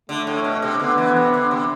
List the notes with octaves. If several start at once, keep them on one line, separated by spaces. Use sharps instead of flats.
D3 A3
A2
B2
C3
D3 B3
E3
C3
D3
C3